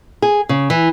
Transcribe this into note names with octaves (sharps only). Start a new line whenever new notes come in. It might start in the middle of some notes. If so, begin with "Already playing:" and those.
G#4
C#3
E3